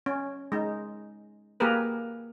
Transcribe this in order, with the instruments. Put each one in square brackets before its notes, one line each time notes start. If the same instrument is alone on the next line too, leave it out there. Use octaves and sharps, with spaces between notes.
[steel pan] C#4
G#3 D#4
A#3 G4 G#4 A#4 B4